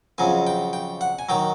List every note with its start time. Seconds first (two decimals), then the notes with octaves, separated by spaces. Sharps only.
0.18 F2 C#3 F#3 G#5
0.47 G5
0.73 G5
1.01 F#5
1.19 G#5
1.29 D#3 F#3 G5